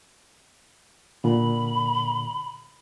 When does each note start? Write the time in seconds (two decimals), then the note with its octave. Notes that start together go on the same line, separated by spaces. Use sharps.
1.24 A#2 D3 B5